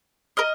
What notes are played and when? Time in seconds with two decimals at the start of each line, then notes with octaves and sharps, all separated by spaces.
0.37 A#4 D#5 F6